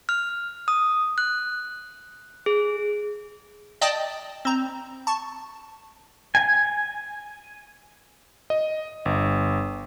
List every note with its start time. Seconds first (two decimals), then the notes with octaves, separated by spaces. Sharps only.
0.09 F6
0.68 D#6
1.18 F#6
2.46 G#4
3.81 D5 D#5 G5 A5 D#6
4.45 C4 A#5
5.07 A5 C#6
6.35 G#5
8.50 D#5
9.05 G1